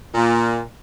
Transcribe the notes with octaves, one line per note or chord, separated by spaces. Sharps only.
A#2